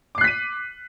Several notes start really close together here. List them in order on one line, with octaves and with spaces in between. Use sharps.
D6 C7 F#6 B6 D#7